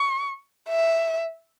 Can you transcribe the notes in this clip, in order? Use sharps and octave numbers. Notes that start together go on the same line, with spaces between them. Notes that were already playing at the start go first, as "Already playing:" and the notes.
Already playing: C#6
E5